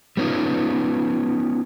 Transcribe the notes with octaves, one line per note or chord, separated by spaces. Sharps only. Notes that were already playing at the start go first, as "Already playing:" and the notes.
G3 B3 C#4 D#4 F4